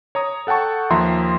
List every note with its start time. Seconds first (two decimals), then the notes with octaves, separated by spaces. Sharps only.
0.15 C#5 A#5 D#6
0.47 A4 F#5 G5 A5 C#6
0.90 D#2 F3 E5 A#5 C6